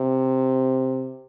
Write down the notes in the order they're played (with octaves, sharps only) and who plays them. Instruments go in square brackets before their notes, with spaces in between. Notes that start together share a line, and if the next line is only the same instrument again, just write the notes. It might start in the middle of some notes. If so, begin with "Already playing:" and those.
Already playing: [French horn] C3